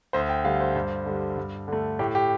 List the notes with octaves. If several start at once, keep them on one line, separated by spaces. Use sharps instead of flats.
D2 C5
G5
D3 G3 F5
C5
G2
D3 G3
G2
D3 A3
A2 G4
G4